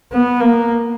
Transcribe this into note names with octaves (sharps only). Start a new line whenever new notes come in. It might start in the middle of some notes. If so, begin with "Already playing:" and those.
B3
A#3